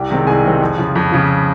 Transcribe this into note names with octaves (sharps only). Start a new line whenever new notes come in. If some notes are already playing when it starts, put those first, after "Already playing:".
Already playing: C2 G4 G5
C3 D#3 G#3 C4
C2 G#4 G#5
C3 D#3 G#3 C4
F2
C#3 F3
F2
C#3 F3